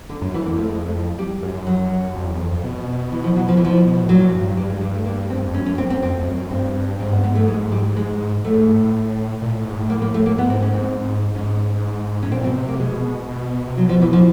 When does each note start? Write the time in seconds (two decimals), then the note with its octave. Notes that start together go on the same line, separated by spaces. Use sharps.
0.09 D3
0.22 F#2
0.34 E3
0.46 F2 A#3
0.58 A3
0.69 G#3
1.19 G3
1.43 F#2
1.67 F#3
2.16 F2
2.27 E2
2.40 F2
2.51 F2
2.64 B2
3.12 E3
3.24 F3
3.36 F#3
3.48 F3
3.57 E3
3.60 B2 F3
4.03 A2
4.09 A#2 F#3
4.33 G2
4.57 G2 G3
4.69 G#3
4.81 G3
4.93 A3
5.06 A#3
5.30 C4
5.45 F2
5.54 F#2 C#4
5.66 C#4
5.78 C4
5.90 C4
6.02 F2 C4
6.19 F2
6.27 F#2
6.51 G2 C4
6.99 G#2 C4
7.10 G2 B3
7.22 G#2 B3
7.35 A3
7.48 G#3
7.72 G3
7.96 G#3
8.45 A2 A3
8.57 G#2
8.70 A2
9.42 A#2
9.52 A2
9.65 G#2
9.77 A2
9.90 A#3
10.02 A#3
10.14 A3
10.26 A#3
10.38 G#2 B3
10.50 C4
10.62 C#4
10.75 C4
11.35 G#2 C#4
12.23 A2 C#4
12.31 A#2 C4
12.44 B2 C4
12.55 C3
12.68 A#3
12.72 C3
12.80 B2 G#3
13.29 B2
13.67 C3
13.77 B2 F#3
13.89 F3
14.01 B2 E3
14.13 F3